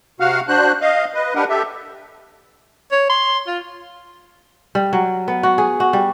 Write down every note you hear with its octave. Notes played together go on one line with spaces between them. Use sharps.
C3 F#4 F5 F#5 F6
D4 F#4 C5 F#6
D#5 F5
B4 D#5
D4 G4 A#4 B4 F#5
G4 A4 E5
C#5
C6
F4
G3
F#3
B3
F#4
G#4
F#4
G3